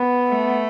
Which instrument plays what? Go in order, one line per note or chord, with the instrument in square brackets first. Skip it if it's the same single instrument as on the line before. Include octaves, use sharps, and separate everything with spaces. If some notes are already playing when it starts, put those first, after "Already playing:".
Already playing: [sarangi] B3
[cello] A3